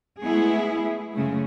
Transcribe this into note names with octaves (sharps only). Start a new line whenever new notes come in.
G#3 A3 B3 E4 G#4
F#2 C#3 G#3 A3